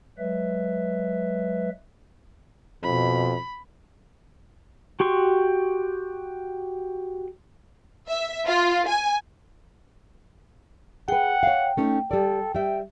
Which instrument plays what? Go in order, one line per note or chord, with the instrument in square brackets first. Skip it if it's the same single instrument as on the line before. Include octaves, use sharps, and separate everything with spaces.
[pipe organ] F#3 G#3 B4 E5
[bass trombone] F2 [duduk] B2 [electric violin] B5
[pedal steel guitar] F#4 G4 C6 C#6
[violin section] E5
F4
G#5
[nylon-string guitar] G#4 B4 [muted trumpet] F#5 [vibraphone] G5
[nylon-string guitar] C#5 F5
A3 C#4 D#4
[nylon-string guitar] G3 D5 [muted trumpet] A4
[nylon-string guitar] G3 E5 [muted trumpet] G5